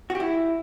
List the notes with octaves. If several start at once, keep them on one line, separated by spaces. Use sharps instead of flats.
F#4
G4
E4